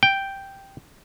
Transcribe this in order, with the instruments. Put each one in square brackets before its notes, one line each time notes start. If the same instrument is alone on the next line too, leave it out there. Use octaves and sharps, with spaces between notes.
[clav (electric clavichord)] G5